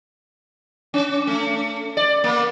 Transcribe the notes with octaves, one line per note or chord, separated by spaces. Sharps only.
C#4
A3
D5
A#3